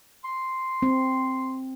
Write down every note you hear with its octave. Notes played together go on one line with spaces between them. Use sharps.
C6
C4